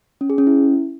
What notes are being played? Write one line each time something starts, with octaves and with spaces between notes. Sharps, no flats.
C#4
G#4
C#4
E4